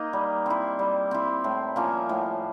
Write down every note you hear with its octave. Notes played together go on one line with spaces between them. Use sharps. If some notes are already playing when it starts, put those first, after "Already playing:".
Already playing: A#3 D#4
G3
C4 E4
G3
C4 E4
A2
F3 A#3 C#4
A2